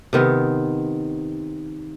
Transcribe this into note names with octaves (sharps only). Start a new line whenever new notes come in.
C3 D#3 B3